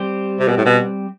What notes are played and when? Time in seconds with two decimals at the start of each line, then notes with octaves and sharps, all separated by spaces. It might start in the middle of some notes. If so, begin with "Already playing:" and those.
Already playing: G3 C4 G4 C5
0.39 C3
0.48 B2
0.57 A2
0.66 B2